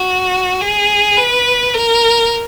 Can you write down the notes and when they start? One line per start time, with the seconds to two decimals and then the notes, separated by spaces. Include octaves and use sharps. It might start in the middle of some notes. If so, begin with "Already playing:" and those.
Already playing: F#4
0.60 G#4
1.17 B4
1.74 A#4